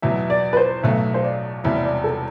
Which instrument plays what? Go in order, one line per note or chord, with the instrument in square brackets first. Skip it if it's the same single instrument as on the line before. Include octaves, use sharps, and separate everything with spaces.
[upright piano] E2 B2 F#3 [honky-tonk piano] E5
[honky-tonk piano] D5
B4
C5
[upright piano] B1 B2 F#3 A3 [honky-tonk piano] E5
[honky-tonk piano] C5
D5
[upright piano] E1 E2 C3 G3 [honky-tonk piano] E5
[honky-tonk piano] D5
A4